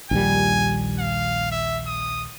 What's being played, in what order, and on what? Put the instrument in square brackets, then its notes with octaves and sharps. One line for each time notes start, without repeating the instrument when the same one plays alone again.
[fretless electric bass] A#1 D#2 G3 [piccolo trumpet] G#5
[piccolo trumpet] F5
E5
D#6